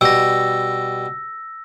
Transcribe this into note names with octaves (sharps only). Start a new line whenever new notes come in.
B2 G3 E6 A#6